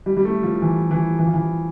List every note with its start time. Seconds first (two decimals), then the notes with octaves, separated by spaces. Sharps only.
0.06 G3
0.17 G3
0.25 A3
0.43 F3
0.62 E3
0.91 E3
1.19 E3
1.27 F3
1.34 E3